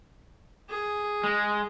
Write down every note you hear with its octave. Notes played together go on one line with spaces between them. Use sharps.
G#4
G#3